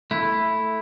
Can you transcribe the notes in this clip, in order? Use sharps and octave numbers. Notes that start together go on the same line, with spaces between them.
A3 E4